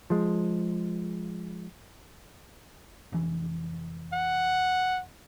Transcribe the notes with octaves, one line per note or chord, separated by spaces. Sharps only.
F3 G#3
F1 E3
F#5